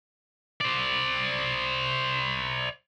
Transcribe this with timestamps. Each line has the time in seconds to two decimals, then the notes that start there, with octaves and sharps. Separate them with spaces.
0.61 C5 D5